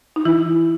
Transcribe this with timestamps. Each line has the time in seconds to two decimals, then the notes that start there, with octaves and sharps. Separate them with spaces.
0.16 D#4
0.25 E3 E4